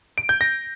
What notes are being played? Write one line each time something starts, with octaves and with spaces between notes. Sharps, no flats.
D7
G6
A#6